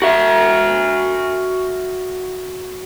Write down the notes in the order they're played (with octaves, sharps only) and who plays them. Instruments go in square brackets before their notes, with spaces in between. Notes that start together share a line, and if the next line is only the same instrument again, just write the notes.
[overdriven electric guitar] F#4 E5